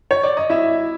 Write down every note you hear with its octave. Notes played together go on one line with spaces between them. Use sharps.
C#5
D5
D#5
G#1 E4 E5